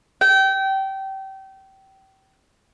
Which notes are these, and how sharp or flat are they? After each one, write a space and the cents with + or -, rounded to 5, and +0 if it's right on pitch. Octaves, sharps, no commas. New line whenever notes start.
G5 -25